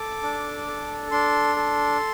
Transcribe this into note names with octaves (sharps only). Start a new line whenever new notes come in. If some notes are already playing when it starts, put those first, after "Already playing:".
Already playing: A4 D6
D4
A4
D4 C6
A4